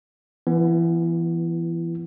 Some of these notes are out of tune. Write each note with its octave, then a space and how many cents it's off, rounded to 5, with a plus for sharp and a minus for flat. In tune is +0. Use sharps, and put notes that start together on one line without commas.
E3 +25 B3 +0